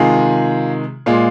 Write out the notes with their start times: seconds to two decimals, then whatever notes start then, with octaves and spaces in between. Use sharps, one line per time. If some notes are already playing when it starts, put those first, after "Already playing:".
Already playing: C3 D#3 G#3 F4 G#4
1.06 A#2 G#3 F4